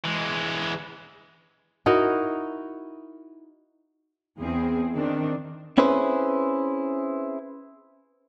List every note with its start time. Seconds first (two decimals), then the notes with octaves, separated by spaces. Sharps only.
0.04 E3 G#3
1.86 D#4 E4 F#4 A#4
4.40 E2 C4 G#4
4.93 D#3 C4 D4
5.78 C4 C#4 E4 G#4 B4 C5